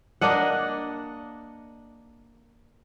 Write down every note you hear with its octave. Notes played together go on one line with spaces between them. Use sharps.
A#3 D4 D#5 F#5